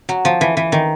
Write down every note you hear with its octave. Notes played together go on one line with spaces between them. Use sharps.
F#3
F3
E3
E3
D#3